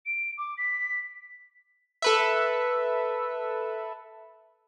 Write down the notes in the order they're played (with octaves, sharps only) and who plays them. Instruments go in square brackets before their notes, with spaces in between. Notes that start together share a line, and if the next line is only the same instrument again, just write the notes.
[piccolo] D7
D6
B6
[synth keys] A4 B4 E5